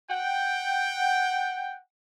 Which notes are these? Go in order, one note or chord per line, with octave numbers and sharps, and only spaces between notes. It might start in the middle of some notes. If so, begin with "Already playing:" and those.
F#5 G5